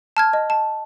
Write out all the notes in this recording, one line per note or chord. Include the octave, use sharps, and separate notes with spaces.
A5 F6 G#6
D#5
A5